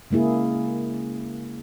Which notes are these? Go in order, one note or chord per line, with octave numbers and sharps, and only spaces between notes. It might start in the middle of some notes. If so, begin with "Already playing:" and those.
C#3 G#3 A#3 E4 G#4